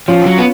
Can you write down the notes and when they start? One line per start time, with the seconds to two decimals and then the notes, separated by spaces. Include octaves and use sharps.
0.08 F3 C#4 F4
0.26 F#3
0.38 B3